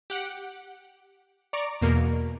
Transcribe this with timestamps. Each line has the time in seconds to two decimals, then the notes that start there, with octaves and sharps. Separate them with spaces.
0.10 G4 F#5 D7
1.53 D5 A#5 C#6 D6
1.82 E2 B2 A#3 A#4